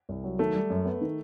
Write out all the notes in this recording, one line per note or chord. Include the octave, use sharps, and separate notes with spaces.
C2
F#3
D#3 A3
G3
F#2
B3
D#3